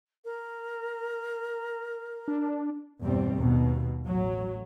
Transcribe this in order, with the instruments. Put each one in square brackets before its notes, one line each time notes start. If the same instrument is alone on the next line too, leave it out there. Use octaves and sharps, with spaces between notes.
[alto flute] A#4
[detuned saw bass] D4
[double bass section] E2 G2 B2 G3 C4
D#2 B2
A1 F#3